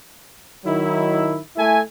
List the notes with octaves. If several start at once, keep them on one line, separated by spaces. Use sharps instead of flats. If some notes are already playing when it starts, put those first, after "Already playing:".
D#3 F#3 D#4 E4
A3 E4 A4 E5 G#5